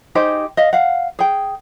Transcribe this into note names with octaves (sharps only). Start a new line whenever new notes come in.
D#4 G4 G#4 C5
D#5 F5
F5 F#5
G#4 G5